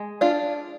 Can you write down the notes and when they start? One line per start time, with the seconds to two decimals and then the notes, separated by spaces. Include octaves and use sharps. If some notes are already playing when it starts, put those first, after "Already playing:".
Already playing: G#3
0.21 D4 F4